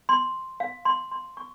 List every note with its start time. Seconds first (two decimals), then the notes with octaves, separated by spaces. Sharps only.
0.09 C6
0.60 F5
0.85 C6
1.12 C6
1.37 C#6